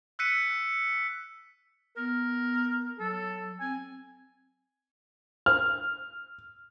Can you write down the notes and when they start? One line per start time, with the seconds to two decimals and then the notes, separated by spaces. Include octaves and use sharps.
0.19 E6 F#6 B6 C#7 D#7
1.97 B3 A#4
2.99 F#3 A4
3.60 C4 G#5
5.46 F6